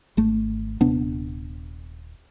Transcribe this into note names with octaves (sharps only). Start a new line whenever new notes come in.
G#1 A3
D#1 C3 B3 D4